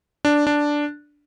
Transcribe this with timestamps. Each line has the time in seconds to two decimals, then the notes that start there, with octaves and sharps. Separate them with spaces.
0.25 D4
0.47 D4